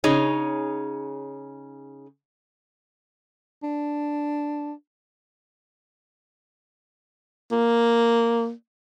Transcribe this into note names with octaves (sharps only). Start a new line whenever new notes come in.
C#3 D#4 G#4 C#5
D4
A#3